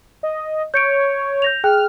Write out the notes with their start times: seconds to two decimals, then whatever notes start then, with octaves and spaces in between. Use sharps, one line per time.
0.23 D#5
0.74 C#5 G6 C#7 D7
1.42 G6 A#6 F7
1.64 G#4 G5 F6 F#6